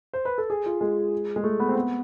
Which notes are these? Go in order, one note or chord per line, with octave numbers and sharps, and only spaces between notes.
C5
B4
A4
G#4
F4
G#3
G#3
A3
B3
C4
B3